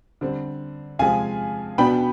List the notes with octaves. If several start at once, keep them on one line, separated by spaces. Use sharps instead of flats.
D3 G3 C4
C3 F3 G#3 F5 G#5
B2 B3 D4 G5 B5